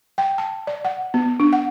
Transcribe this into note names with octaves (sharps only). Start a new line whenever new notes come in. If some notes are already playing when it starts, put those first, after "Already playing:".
G5
A5
D5
F#5
B3
D4
F#5